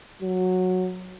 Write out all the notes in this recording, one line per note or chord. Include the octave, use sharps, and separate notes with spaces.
F#3